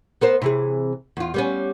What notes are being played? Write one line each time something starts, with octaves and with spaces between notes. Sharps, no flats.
B3 A#4 C5
C3 E3 G#4
E2 F4
G3 B3 C#4